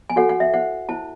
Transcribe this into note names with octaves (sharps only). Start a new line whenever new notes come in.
G#5
F#4 A4 C#5 F#5
F#5
E5
E4 C5 F#5
E4 C5 A5